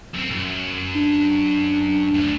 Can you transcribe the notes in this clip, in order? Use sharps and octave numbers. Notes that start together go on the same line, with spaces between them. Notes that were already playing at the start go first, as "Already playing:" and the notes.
F#2 C4
B1 F#2
D4
D2